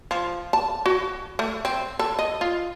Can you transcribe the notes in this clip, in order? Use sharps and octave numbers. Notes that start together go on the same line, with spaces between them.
F3
A5
F#4
A3
C4
A4
D#5
F4